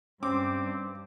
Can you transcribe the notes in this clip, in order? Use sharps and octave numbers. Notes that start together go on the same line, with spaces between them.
G2 C4 C#4 D6